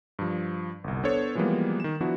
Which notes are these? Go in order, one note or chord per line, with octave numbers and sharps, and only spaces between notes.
G2 F3
G1 C2
B3 D4 A4 C5 C#5
E3 F3 G3 G#3 A#3 B3
D#3 E7
F3 B3 D4 E4 F#4